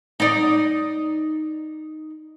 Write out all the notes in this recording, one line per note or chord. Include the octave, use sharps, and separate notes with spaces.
D#4 D5